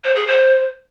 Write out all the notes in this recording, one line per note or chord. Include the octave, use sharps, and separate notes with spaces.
C5
G#4
C5